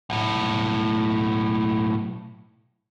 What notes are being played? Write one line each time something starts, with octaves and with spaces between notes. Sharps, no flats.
B1 A2